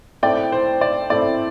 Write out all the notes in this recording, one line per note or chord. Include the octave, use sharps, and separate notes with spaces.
A2 A3 C4 E4 D5 G5
C5
D5
A2 A3 C4 E4 D5